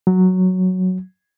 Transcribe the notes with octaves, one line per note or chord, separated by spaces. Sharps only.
F#3